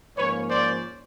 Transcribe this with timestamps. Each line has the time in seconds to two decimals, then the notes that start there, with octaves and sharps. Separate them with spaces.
0.16 G#2 F3 A#3 C#4 B4 C#5
0.49 C5 D5